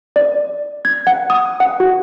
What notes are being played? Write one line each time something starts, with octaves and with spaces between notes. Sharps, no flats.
D5
G#6
F#5
D#6
F#5
F#4